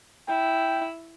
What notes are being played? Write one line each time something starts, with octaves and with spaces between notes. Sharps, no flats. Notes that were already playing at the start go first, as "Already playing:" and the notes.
E4 G5